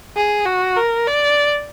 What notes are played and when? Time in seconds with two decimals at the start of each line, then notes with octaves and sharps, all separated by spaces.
0.16 G#4
0.46 F#4
0.76 A#4
1.06 D5